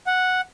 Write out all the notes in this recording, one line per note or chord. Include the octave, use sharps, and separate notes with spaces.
F#5